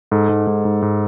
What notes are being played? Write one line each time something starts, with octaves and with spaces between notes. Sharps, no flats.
G#2 A4
G#2
G#2
G#2
G#2